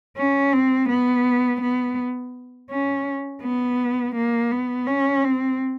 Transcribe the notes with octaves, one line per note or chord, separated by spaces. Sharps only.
C#4
C4
B3
B3
C#4
B3
A#3
B3
C#4
C4